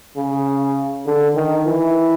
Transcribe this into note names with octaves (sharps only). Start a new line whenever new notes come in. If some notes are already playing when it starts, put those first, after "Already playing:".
C#3
D3
D#3
E3